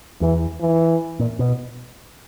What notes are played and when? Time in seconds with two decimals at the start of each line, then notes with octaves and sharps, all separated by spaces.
0.21 E2 E3
0.61 E3
1.20 A#2
1.39 B2